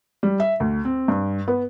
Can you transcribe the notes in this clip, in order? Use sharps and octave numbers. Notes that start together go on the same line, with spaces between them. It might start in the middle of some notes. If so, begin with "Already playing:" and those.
G3
E5
D2
C4
G2
B3